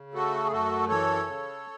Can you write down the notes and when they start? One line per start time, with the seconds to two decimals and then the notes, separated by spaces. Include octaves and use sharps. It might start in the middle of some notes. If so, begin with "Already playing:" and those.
Already playing: C#3
0.14 A3 F#4 A4
0.45 G#4
0.52 F#2 F#4 A4
0.89 E3 A4 C#5
1.27 C#3